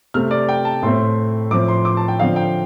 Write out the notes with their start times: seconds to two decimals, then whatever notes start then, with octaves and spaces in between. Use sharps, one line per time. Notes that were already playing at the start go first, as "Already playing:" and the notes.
0.14 C3 A3 C4 F6
0.31 D5
0.49 G5
0.65 A5
0.82 A2 A3 C4 C6
1.51 A2 F3 C4 D6
1.68 C6
1.85 D6
1.97 A5
2.08 G5
2.19 D3 F3 C4 F5
2.36 G5